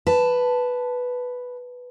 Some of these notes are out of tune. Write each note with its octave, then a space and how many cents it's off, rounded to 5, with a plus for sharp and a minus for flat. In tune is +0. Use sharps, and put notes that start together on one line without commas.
B4 +0 A5 +0